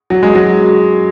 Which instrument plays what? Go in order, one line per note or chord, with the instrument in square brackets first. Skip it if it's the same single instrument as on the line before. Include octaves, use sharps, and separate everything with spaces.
[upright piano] F#3
G#3
F#3